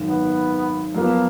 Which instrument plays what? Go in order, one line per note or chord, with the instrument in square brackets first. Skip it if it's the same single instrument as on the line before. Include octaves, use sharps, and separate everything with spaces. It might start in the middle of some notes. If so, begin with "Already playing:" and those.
Already playing: [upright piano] G#1 F#2 D#3
[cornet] B3
[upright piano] F#2 F3 B3 [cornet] A#3